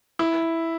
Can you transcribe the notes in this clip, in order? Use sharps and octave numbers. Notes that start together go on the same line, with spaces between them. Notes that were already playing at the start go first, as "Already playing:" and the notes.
E4